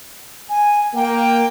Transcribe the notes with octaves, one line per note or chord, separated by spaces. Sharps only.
G#5
A#3 G5